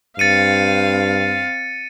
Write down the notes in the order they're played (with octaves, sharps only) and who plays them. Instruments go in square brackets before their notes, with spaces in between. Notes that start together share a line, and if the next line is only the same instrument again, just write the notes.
[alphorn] G2 [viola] C4 F5 [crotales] A6 C#7 D#7